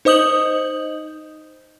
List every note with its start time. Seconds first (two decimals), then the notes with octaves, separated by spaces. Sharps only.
0.05 D#4 C5 D#5 D#6 G6 F#7